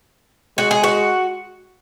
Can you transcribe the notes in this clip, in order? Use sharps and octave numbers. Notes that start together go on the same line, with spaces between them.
G#3 F#4
G#4
F#4